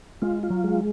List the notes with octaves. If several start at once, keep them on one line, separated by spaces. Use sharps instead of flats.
G#3 F4
F4
F#3
G#3